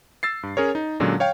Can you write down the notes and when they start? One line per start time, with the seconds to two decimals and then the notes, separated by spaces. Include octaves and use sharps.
0.23 E6 A6 C7
0.43 G2
0.57 C#4 G#4 A#4 C#5
0.75 D#4
1.00 A#2 D3 F#3 G#3 C#4 D4
1.20 C#5 F5 G5